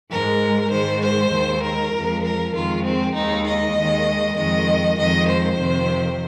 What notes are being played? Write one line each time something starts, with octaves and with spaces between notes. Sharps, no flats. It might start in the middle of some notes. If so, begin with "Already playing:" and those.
G#2 G#3 A#4
G#2 D#3 G#3 C5
C5
D#2 D#3 G#3
A#4
F2 F3 G#3
A#4
F2 D#3 G#3 F4
C4
D#2 D#3 G#3 D#4
D#5
D#2 D#3 G#3
F2 D#3 G#3 D#5
F2 D#3 G#3 D#5
C5
F2 C3 D#3